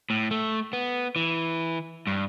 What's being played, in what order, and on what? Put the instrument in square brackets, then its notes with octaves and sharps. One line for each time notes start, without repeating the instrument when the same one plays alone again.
[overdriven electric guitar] A2
A3
B3
E3
G2